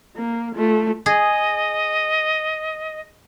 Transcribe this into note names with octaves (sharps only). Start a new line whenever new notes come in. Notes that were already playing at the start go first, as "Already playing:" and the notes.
A#3
A3 F4
G#4 D#5